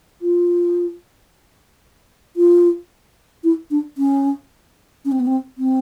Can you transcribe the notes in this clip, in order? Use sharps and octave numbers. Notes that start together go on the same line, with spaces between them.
F4
F4
E4
D4
C#4
C#4
C4
B3
C4
C4